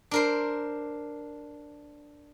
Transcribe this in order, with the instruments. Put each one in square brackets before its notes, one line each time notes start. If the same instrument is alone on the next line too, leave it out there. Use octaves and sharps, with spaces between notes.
[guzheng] D4 A#4 C5